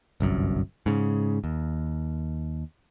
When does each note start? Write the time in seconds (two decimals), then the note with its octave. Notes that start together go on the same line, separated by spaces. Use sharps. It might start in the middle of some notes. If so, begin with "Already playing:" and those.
0.20 G1 C2 F#2
0.86 G#2 C#3
1.44 D#2